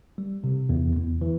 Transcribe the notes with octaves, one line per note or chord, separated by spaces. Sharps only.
G3
C3
E2
E2
E3